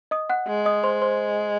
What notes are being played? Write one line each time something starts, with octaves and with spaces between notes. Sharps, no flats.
D#5 D#6
F#5 F#6
G#3
D#5 D#6
C5 C6
C5 C6